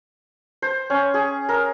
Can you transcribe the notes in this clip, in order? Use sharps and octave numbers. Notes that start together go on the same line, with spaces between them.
C5
C#4
G#4
A#4